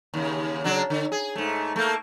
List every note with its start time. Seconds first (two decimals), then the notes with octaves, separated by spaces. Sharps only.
0.14 D#2 C#3
0.64 C#3 F#3 D4
0.90 D3
1.12 G#4
1.36 G#2 A3
1.76 A3 A#3